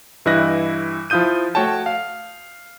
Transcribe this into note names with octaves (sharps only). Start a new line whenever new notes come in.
G2 E3 E4 D#5 F#6 A#6
F3 E4 F4 D#6 G6 D#7
A3 F#4 C#5 G5 A5
F5